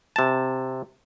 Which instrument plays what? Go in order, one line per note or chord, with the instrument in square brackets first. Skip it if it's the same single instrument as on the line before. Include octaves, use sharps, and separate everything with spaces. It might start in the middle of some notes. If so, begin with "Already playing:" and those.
[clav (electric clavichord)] C3 A5